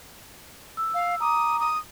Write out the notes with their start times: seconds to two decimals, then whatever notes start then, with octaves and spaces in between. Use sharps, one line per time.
0.77 E6
0.94 F5
1.20 A#5 D6 D#6
1.60 D#6